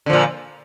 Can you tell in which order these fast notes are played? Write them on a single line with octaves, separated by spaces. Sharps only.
D3 F3 A#2